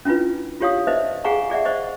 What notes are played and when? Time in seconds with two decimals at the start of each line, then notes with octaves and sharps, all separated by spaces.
0.05 C#4 D4 E4 F4 B4
0.60 F4 G4 C#5 F5 D#6
0.87 D#4 B4 C5 D#5 E5
1.24 G#4 F5 F#5 G#5 A#5 C#6
1.50 G#4 D5 E5 F#5
1.65 C5 D#5 C#6